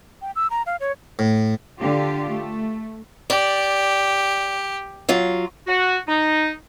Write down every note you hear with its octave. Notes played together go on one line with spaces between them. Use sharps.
G5
E6
A#5
F5
C#5
A2
D3 F4 G4
A3
G4 D5
F#3 F4
F#4
D#4